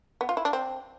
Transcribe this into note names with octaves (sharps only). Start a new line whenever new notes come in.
B3
F4
E4
D4
C4